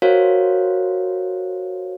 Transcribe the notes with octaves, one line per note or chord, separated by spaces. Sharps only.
F#4 A#4 C5 C#5 F5